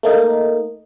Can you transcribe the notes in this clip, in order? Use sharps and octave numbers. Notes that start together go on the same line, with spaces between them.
A3 A#3 D#4